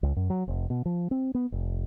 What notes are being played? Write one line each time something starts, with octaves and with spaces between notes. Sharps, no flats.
C#2
F#2
F#3
F1
B2
F3
C4
B3
F1